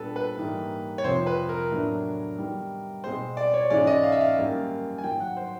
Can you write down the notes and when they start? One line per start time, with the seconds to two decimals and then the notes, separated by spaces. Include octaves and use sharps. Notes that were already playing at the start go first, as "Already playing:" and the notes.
Already playing: A#2 G3 B3 D4 A4 B4
0.16 B4
0.37 G#2 E3 G3 A#3
0.98 C#5
1.04 F2 C3 F3 C5
1.27 B4
1.49 A#4
1.71 A2 F#3 B3 D4
2.38 D#3 G3 B3
3.04 B2 G#3 C4 C5
3.37 D5
3.54 C#5
3.70 G#2 E3 G#3 C#4 D5
3.87 D#5
4.03 F5
4.12 E5
4.21 F5
4.37 F#2 D#3 G3 A#3
4.98 G#5
5.03 G#2 D#3 F#3 G5
5.20 F#5
5.37 C5